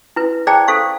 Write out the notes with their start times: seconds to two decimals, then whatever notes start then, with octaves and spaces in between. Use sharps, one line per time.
0.16 E4 B4
0.47 G#4 C5 D5 G5 A5 A#5
0.68 A4 C5 F5 C#6